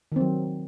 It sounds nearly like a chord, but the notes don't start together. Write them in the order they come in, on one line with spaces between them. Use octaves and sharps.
D#3 C4 F#3